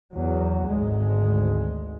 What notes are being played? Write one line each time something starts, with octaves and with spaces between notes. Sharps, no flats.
E2 F#3
G#1 D2 G#3